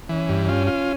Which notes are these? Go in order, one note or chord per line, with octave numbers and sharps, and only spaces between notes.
E3 C#4
G2
C#4 F4
F4